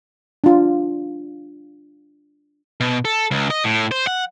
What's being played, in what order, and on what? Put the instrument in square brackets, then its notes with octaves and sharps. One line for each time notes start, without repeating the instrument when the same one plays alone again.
[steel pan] D4 F4
[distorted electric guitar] B2
A4
C#2
D#5
A2
C5
F#5